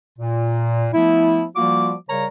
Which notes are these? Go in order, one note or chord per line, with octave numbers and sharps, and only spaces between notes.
A#2
F3 A3 B3 E4
F3 G3 A#3 F4 F#4 D6
C#3 G3 A#4 C#5 A#5